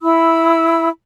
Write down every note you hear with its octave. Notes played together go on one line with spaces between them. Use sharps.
E4 B5 E6